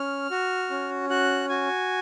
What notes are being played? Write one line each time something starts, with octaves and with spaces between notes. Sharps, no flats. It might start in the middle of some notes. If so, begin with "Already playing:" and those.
Already playing: C#4 F6
F#4
C#4
F#4 F#6
F#4 G#5